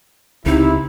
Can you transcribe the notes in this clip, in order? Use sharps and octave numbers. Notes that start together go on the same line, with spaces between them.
C#2 C3 D#4 E4